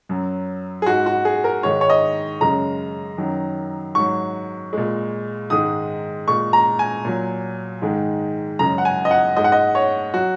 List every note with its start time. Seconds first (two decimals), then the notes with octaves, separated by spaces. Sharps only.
0.09 F#2 F#3
0.82 G#4
0.86 G#2 G#3 F#4
1.06 F#4
1.25 G#4
1.44 A#4
1.63 G#2 D#3 G#3 C#5
1.81 C#5
1.90 D#5
2.41 F#2 C#3 G#3 A#5
3.18 F#2 D#3 F#3
3.95 G#2 F#3 C#6
4.73 A#2 G#3
5.50 G#2 D#3 G#3 D#6
6.27 A#2 G#3 C#6
6.53 A#5
6.79 G#5
7.05 A#2 F#3
7.82 G#2 D#3 G#3
8.59 F#2 C#3 G#3 A#5
8.78 F#5
8.85 G#5
9.05 D#5
9.11 F#5
9.37 G#2 G#3 D#5
9.44 F#5
9.52 D#5
9.75 C#5
10.14 F#3 F#4